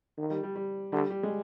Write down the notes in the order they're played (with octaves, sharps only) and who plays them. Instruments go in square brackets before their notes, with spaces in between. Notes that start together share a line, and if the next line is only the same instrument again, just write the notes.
[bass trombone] D#3
[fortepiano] G3
G3
G3
[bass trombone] D3 [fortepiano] G3
[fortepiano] G3
G#3